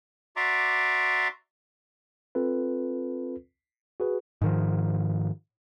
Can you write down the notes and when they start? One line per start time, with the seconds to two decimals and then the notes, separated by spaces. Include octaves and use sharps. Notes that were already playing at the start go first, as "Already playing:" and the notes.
0.36 F#4 D5 E5 A#5 C6 D6
2.35 C4 F4 A4 B4
4.00 F#4 G#4 B4
4.42 G#2 D#3 F3